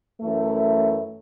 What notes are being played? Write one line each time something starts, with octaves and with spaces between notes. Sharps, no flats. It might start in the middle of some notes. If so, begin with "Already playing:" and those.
F#2 E3 A3